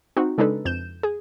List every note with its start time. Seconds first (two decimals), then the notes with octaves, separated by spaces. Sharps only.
0.17 C4 D#4 F#4
0.38 C#3 G#3 D4 D#4 A4 B4
0.65 F2 G6 E7
1.03 G#4